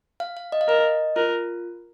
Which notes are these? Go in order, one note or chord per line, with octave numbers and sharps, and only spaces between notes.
F5
F5
D#5
F5
A#4 D#5
F4 A#4